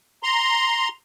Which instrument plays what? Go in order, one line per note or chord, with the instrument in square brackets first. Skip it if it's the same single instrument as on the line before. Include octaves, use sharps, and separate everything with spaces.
[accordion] A#5 C6